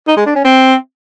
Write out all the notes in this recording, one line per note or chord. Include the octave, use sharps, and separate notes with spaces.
D#4
G#3
D4
C#4
C4